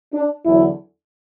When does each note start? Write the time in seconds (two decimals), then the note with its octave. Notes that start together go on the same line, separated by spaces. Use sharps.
0.14 D4
0.45 E2 D3 F#3 E4